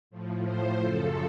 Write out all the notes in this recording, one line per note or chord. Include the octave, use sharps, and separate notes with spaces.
A2 F3
C5
F#2 C#3 F3 A4